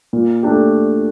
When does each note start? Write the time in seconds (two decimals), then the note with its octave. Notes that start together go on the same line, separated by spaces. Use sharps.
0.13 A#2
0.43 A3 D4 G4